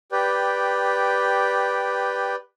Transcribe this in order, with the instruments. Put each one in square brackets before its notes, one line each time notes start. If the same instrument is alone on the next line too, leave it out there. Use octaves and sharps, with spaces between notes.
[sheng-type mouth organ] G4 B4 D5 G5